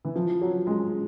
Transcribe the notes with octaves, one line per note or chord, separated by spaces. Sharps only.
E3
F3
F#3
G#3